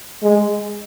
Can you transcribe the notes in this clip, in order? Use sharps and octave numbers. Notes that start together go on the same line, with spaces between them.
G#3